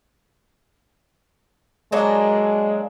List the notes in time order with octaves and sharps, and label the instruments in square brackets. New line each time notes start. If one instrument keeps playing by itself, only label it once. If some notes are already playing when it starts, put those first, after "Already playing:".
[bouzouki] F#3 A#3 D4 [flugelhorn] G#3